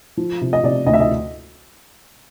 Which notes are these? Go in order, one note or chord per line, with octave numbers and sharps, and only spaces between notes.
F3
C3
D#5
C3 D5
D2 D#5
E5
D#5